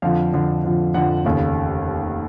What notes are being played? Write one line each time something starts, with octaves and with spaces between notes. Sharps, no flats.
F2 D3 F3 F5
F2 D3 F3
F2 D3 F3
F2 D3 F3 F#5
F1 D#2 C#3